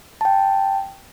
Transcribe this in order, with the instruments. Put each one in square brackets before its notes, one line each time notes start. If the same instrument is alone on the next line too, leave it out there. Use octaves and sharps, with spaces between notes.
[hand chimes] G5 A5